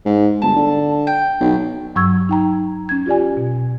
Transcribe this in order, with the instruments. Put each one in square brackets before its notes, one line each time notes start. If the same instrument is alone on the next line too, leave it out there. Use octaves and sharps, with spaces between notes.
[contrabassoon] G#2
[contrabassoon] G1 [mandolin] A5
[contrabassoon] D3
[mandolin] G5
[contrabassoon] B1
[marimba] G2 F#3 C#6 E6 G#6
D#4 G5 A#5
C#4 G#6
F4 G4 D5 G#5
B2